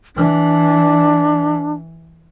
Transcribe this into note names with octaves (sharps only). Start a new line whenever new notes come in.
E3 D4